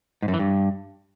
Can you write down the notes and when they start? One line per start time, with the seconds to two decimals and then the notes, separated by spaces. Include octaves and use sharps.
0.22 G#2
0.28 F#2
0.34 E3
0.39 G2